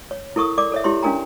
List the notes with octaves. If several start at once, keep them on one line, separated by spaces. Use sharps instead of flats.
C#5
E4 A4 A#4 C#6 D#6
A#4 D5 D6
A4 C#5 E5
E4 G4 C#5 C6
C#4 D4 A#4 G#5 A#5